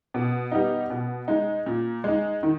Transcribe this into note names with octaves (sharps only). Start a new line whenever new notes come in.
B2
G3 B3 D#4
B2
G#3 D#4
A#2
G#3 D#4
D#3